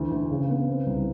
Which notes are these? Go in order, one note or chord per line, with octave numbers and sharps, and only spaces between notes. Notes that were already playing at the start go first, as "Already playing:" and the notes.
Already playing: D2 E3
D2
C#3
B3
C4
C2